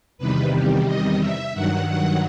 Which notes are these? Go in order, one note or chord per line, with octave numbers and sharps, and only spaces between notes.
E2 C3 D#3 G3 B4
G4
D#5
E5
G2 D#3 F#3 F#5
F#5